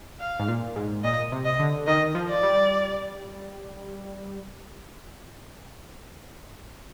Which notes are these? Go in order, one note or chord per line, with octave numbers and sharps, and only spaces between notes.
F5
G#2
A#2
G#2
A#2 D#5
C3
D#5
D3
D#3 D#5
F3
D5
G3